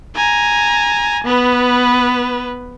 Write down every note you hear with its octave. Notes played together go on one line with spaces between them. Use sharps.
G#5 A#5
B3 B4